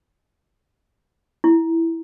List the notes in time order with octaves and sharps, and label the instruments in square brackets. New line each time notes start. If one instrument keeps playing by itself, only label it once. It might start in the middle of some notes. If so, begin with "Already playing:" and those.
[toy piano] E4